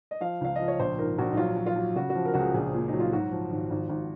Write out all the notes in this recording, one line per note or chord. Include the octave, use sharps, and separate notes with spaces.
D#5
F3 F5
C#2 F5
F3 D#5
C#5
A#1 C5
G#2 A#4
A#1 F#4
D#4
F#3 F4
F#3
F4
F#3
C#3 F#4
F#4
F3
A#4
C#2 F#4
G#4
A#1 G#4
A#2
F#3 D#4
F4
G#2 F#4
F3
G#1
G#1
G#1